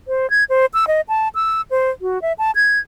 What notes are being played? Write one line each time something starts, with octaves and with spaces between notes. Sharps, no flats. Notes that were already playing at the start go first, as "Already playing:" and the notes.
C5
G#6
C5
E6
D#5
A5
E6
C5
F#4
E5
A5
G#6